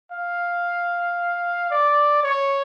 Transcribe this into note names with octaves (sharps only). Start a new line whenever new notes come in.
F5
D5
C#5